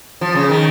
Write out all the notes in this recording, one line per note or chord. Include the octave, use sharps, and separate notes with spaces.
F3
C#3
D#3